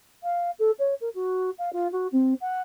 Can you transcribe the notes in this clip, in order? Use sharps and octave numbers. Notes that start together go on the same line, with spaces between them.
F5
A4
C#5
A#4
F#4
F5
F4
F#4
C4
F#5